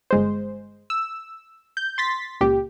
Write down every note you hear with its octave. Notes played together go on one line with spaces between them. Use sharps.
G1 G#3 C5
E6
G6
C6 A6 B6
C#2 A#2 G4